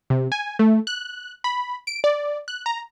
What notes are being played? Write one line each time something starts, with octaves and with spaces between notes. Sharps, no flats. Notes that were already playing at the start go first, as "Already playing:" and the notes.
C3
G#5
A3
F#6
B5
D7
D5
F#6
A#5